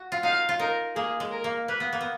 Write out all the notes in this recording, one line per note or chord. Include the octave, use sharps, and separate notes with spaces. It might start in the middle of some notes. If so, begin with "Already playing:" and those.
Already playing: F#4
F4
D#4 F5
F4
D#4 A#4
A#3 G#4
G#3
A#4
A#3
A#3 B4
B3
A#3
B3